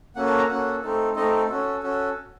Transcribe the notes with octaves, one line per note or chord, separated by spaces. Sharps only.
A#3 C#4 F#4 A4 F#5
A5
A#5
A#3 C#4 F#4 A4 F#5
A3 C4 D#4 A4
A3 C4 D#4 A4 D#5
C#4 F#4 A4
C#4 F#4 A4